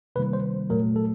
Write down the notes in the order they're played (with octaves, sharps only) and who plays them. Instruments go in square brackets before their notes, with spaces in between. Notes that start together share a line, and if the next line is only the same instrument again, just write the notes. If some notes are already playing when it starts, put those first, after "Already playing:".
[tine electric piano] C3 D#3 G3 A#3 B4
C5
A#2 F#3 A3 A#4
A4